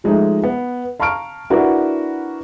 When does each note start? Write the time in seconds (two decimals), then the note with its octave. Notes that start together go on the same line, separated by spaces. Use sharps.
0.04 F3 G#3 A3 D#4
0.44 B3
1.00 F5 A5 A#5 C#6 F6 D7
1.50 D4 E4 F#4 A#4 B4